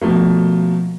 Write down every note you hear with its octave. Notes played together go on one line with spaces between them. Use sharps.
B2 F3 A3 A#3